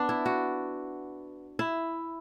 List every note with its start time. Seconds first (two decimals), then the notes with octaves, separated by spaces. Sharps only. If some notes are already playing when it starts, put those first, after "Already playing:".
Already playing: B3 D4
0.09 E4
0.26 F#4
1.59 E4